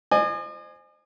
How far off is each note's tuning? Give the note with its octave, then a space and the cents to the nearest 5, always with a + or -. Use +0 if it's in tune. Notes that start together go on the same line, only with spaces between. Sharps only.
C5 +0 D#5 -45 G#5 +0